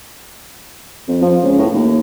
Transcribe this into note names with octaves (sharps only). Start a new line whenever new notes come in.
F2
F3
C#2
A2
D#2